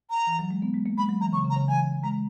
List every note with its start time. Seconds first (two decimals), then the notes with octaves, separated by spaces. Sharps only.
0.10 A#5
0.27 E3
0.39 F#3
0.51 G#3
0.62 B3
0.74 G#3
0.86 A#3
0.98 G#3 B5
1.09 F#3
1.21 E3 A#5
1.32 C#3 C#6
1.44 C#3
1.50 A#5
1.56 C#3
1.68 E3 G#5
2.03 G#3 A#5